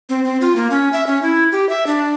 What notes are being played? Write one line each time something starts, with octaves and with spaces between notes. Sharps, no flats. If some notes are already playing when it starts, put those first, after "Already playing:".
C4
C4
F4
A#3
C#4
E5
C#4
E4
G4
E5
D4